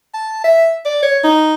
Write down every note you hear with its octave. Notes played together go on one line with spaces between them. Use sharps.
A5
E5
D5
C#5
D#4